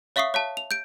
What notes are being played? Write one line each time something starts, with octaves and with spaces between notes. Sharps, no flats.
C#5 E5 F5 C#6 D#6 C7
C#5 F5 A5
F7
G6 D7